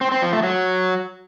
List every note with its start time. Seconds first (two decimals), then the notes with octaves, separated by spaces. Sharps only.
0.01 C4
0.12 C4
0.22 F3
0.33 A3
0.43 F#3